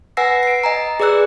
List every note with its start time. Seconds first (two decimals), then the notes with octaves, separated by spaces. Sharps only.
0.17 B4 F#5 G#5 E6 A#6 C7
0.43 C7 D7
0.64 D#5 G#5 A#5
1.00 G#4 B4 D5 E6 F#6